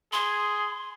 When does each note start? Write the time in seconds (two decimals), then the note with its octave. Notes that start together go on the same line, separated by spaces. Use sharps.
0.13 G#4 C6